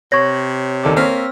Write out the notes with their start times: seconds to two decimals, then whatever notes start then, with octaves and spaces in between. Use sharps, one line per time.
0.12 C3 C#5 C#6 G#6 A#6
0.83 D#2 A4 D5
0.96 A#3 C4 C#5 E6 F6 B6